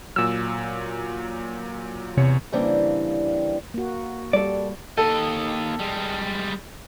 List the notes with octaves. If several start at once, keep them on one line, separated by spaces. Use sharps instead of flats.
A#2 F#3 E6
E2 C3 C#5 C#7
C#3 E3 G3 A#3 C4 D4
A#3 F#4
G3 A4 D5
D#2 A4 D#5
G3 G#3